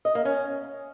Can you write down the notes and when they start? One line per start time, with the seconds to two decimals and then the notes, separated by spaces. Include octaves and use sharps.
0.05 D#5
0.15 A#3
0.25 C#4